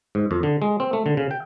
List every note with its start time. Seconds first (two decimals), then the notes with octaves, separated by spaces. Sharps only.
0.15 G#2
0.31 F2
0.43 D3
0.62 G#3
0.80 C4
0.93 A3
1.06 D3
1.17 C#3
1.31 G5